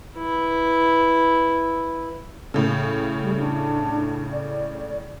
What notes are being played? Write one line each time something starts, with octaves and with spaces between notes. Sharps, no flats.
E4 B4
A2 C#3
G3
D4
D5